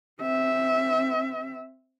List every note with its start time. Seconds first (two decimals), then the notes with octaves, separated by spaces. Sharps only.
0.21 C4 E5